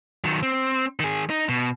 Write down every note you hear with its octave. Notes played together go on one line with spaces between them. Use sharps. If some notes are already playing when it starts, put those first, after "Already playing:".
D#3 F#3
C4
D#3 G#4
D#4
B2